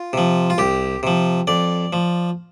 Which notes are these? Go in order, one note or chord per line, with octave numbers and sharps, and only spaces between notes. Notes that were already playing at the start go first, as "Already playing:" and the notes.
Already playing: F4
C3 F3
F4
C2 G4
C3 F3
F2 D5
F3